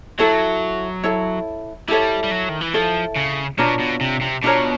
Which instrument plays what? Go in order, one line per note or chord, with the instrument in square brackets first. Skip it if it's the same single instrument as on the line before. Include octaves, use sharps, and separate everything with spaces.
[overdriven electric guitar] F#3 [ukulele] E4 A4 C#5
[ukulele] E4 A4 C#5
[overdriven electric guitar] G3 [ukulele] E4 A4 C#5
[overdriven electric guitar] G3
F#3
D#3
E3
[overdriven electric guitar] F3 [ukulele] E4 A4 C#5
[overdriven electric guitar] C#3
[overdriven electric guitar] B2 [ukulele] D4 F4 A#4 C#5
[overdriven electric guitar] B2
C3
C3
[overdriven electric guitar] B2 [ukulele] D4 F4 A#4 C#5